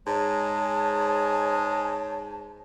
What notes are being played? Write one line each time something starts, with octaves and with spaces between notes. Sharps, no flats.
G#2 G#3 C#5 A5